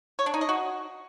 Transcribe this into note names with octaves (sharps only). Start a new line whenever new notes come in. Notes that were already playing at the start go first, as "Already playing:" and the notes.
C#5
D4
D#4
D#5
F#4